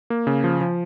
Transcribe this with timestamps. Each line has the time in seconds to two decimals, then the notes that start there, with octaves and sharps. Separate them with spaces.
0.10 A#3
0.27 C#3
0.44 F3
0.61 F3